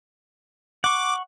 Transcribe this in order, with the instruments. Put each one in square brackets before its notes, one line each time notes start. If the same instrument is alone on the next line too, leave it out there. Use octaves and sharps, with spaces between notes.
[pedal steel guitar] F#5 C#6 [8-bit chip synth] D6